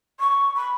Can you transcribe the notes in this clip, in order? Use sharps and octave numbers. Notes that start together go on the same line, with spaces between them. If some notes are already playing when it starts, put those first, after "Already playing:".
C#6
B5